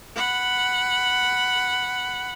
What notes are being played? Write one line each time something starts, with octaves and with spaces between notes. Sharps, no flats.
F#5 B5